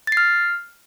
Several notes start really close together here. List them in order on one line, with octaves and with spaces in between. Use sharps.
A6 C7 F6